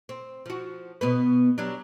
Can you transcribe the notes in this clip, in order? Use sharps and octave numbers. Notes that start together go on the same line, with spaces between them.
C4
F3 F#4
B2 B3 B4
F#3 G3 D4